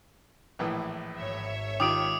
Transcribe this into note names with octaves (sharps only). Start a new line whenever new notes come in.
A#1 A2 E3
G#1 C#5 E5
D#3 F4 G4 D6 D#6 D7